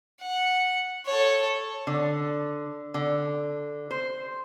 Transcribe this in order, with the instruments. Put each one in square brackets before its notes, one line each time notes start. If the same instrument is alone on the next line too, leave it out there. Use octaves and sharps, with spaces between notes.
[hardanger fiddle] F#5
A4 C#5
[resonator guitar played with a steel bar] D3
D3
C5